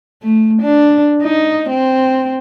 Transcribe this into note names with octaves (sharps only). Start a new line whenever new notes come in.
A3
D4
D#4
C4